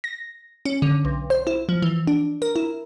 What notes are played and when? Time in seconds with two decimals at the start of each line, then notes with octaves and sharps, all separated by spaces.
0.04 A#6
0.65 C#4
0.82 D3
1.05 B1
1.30 C5
1.47 E4
1.69 F3
1.82 E3
2.07 D4
2.42 A#4
2.56 E4